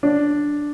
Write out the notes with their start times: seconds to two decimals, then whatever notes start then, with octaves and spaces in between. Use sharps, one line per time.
0.03 D4